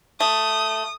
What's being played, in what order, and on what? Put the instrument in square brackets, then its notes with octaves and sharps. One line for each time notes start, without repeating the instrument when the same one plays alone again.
[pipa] A3 [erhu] D#6